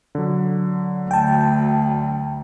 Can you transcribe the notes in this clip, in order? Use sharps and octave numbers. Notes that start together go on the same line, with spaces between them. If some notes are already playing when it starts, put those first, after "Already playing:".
D3 F#3
D2 G5 A5